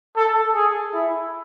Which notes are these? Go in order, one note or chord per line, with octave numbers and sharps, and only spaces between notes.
A4
G#4
E4